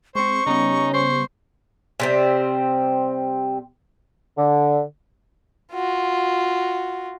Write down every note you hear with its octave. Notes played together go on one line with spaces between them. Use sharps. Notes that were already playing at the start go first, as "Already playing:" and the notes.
G#3 C4 C5 C#6
C#3 G3 B3 C#4 D#4
C5 C#6
C3 G3 C4
D3
F4 F#4